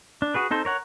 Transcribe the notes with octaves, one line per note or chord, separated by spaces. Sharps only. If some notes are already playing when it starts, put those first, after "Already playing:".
D4
F#4 G#4 B4
C4 D#4 A4 C5
A#4 C#5 F#5 A#5